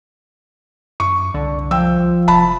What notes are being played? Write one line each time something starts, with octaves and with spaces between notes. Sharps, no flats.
F#2 C#6
C2 D3
F3 G5 E6
F1 A5 B5